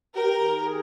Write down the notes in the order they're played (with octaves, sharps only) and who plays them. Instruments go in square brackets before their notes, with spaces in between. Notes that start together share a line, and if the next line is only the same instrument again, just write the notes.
[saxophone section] G4 [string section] A#4
[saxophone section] D#3
G#4